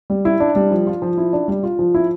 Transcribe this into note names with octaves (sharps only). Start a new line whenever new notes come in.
G3
E4
D4
G3
F3
F4
F3
E4
D4
G3
F4
F3
E4